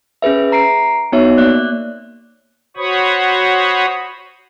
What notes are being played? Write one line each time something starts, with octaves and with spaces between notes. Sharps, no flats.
C#4 G#4 B4 E5
A#5 C7 D7
B3 D#4 F#4 C#5 E5
A#3 D5 F#6
F#4 C5 C#5 B5 C#6 D#6